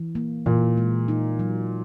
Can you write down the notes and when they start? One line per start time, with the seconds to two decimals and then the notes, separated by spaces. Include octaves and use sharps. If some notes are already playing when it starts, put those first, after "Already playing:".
Already playing: E3
0.15 A#3
0.46 A#2 E3
0.77 G#3
1.08 D#4
1.39 F#3